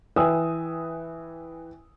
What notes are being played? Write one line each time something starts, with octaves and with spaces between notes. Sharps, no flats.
E3 B4 G5 G#5 D#6 E6